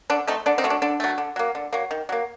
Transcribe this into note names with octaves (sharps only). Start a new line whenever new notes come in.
D3 D4
A3 C4 D#4
D3 D4
C4 D#4
F#3 A3
D4
D3 D4
F#3 A3
D3
F#3 A#3
D3
F#3 A#3
D#3
F#3 A#3